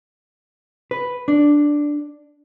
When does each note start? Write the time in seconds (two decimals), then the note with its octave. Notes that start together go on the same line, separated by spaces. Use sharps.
0.91 B4
1.28 D4